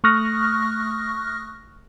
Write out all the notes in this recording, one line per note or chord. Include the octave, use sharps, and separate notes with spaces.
A3 C#6 D#6 F6 F#6 A#6